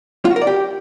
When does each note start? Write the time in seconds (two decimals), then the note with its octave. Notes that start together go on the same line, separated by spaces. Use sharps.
0.25 F4
0.30 F#4
0.36 A#4
0.42 D5
0.47 G4